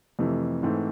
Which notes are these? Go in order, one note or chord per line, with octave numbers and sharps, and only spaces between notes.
F2 C3 E3 A3
G#2 E3 A3 C4